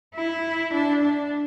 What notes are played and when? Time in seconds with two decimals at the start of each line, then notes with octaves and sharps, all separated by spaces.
0.15 E4
0.73 D4
1.02 D4